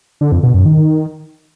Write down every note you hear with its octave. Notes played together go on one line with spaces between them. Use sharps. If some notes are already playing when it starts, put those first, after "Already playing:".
D3
F2
B2
F#2
D#3